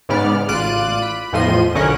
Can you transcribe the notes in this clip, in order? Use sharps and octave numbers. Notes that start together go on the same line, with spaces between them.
G#2 C#3 B3 D5 F6
A1 F4 D5 F#6 D7 D#7
B5
E2 A2 F3 D#5 C6 D#7
B1 D3 C#4 A#4 F#6